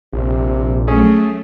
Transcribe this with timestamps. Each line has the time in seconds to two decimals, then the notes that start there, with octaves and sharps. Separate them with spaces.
0.13 A#1 C3
0.88 F#3 A3 C#4 G#4